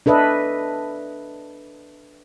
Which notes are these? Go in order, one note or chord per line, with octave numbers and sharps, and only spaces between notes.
D4 A4 B4 D#5 E5